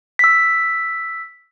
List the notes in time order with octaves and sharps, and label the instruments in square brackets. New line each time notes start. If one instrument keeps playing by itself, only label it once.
[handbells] E6 B6